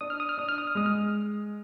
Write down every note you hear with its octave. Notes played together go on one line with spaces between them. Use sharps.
D4 D#6
F6
D#6
F6
D4 D#6
F6
D#6
F6
G#3 D#6
F6